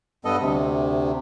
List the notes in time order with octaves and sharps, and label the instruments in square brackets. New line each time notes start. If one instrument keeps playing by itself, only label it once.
[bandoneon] G2 B3 A4 D#5
D2 C3